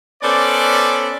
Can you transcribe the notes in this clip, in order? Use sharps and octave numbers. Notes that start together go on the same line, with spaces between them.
B3 C#4 A4 C5 D5